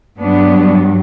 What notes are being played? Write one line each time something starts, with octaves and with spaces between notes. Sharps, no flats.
G2 F#3 B3 D4